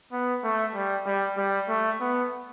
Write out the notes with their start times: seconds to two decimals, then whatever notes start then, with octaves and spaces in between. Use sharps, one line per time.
0.12 B3
0.44 A3
0.74 G3
1.06 G3
1.37 G3
1.69 A3
2.01 B3